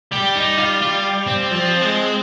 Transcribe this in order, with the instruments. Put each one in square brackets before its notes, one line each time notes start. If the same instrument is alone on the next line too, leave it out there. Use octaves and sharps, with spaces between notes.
[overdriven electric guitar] G3 [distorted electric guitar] G4
[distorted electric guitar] D#4
F4
F4
C4
[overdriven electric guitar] F3
G#3